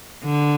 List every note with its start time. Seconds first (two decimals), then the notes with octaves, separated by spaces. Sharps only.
0.24 D3